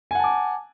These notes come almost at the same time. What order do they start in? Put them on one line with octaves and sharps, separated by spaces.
G#5 F#5 A5 D6